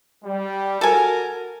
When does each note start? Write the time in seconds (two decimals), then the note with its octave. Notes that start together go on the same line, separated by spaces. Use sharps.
0.25 G3
0.81 F#4 A4 A#4 G#5